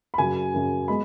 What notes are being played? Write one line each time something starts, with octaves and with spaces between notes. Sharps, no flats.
B5
F#2 C#3 F#3 G#5
F#2 C#3 F#3
G#3 B3 B5